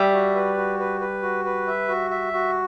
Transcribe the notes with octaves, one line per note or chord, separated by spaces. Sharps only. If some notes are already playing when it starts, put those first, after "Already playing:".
Already playing: G3 E5
F#4
B4
F#4
B4
B4
F#4
B4
E5
F#4
E5
F#4